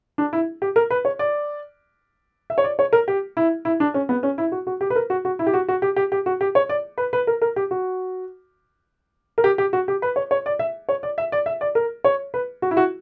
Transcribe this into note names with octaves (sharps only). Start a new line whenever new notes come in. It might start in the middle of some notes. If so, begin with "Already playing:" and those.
D4
E4
G4
A#4
B4
C#5
D5
E5
C#5
D5
C#5
A#4
G4
E4
E4
D4
C#4
B3
C#4
E4
F#4
F#4
G4
B4
A#4
F#4
F#4
E4
G4
F#4
F#4
G4
G4
G4
F#4
G4
C#5
D5
B4
B4
A#4
A#4
G4
F#4
A#4
G4
G4
F#4
G4
B4
C#5
C#5
D5
E5
C#5
D5
E5
D5
E5
D5
A#4
C#5
B4
F#4
E4
F#4